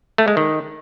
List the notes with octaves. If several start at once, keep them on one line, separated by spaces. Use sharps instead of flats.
A3
G#3
D#3